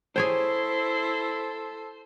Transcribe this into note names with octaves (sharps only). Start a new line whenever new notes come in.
E4 G#4 A4 C5 C#5 G5 C6